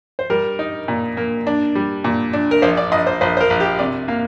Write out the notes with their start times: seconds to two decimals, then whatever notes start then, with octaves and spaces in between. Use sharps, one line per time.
0.19 C5
0.30 G3 A#4
0.59 D#4
0.88 A#2
1.17 A#3
1.47 D4
1.75 G3
2.04 A#2
2.33 D4
2.51 A#4
2.62 A#1 C5
2.77 D5
2.92 A#1 D#5
3.07 C5
3.21 A#1 C5
3.37 C5
3.40 A#4
3.50 A#1
3.60 G4
3.79 C3 D5
4.08 A#3 F5